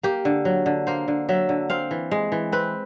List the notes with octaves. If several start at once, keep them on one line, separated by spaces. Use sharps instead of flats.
A#3 G4
D3
F#3
D3
A#3 C5
D3
F#3 E5
D3
C4 F5
E3
G#3
E3
C4 B4